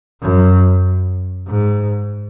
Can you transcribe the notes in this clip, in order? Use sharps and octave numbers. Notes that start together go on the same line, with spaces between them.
F#2
G#2